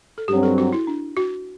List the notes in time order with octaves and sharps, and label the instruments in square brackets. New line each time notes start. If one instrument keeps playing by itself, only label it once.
[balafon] A4
[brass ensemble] G2 F#3 C4 [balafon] G4
[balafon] A4
F#4
E4
D4
F#4